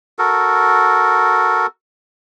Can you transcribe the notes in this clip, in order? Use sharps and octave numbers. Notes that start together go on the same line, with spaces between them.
F#4 A4 A#4